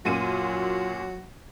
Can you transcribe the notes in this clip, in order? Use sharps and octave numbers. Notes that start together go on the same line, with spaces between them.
F#2 A#2 F#3 F4 F#4 D#7